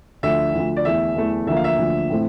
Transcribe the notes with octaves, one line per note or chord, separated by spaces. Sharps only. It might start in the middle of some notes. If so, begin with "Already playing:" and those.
D2 D3 F3 E5
D2 D3 F3
D5
E2 E3 A3 E5
E2 E3 A3
D2 D3 F3 A#3 E5
F5
E5
D2 D3 F3 A#3
A2 E3 A3 C4